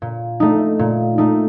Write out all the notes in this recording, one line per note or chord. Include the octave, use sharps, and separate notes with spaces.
A#2
A3 D#4
A#2
A3 D#4